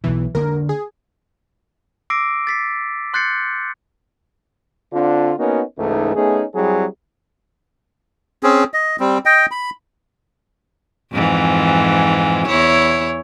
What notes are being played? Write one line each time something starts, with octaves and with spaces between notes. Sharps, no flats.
B1 B2 E3
D3 A#3 D4 A#4
G#4
D6 E6 A#6 C7 D7
A6 B6 C7
C6 F#6 G6 A6 C7 C#7
D3 C4 D4 F4
A#3 B3 C#4 D#4 F#4 A#4
C#2 G#2 E3 A3 D#4
A3 B3 C#4 D#4 G#4
F#3 G3 C4 E4 G#4
C4 C#4 G#4
D#5
G3 C4
D#5 G5
B5
F2 G#2 E3
E2 E4 C#5